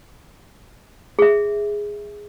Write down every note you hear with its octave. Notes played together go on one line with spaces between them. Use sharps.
G#4 E5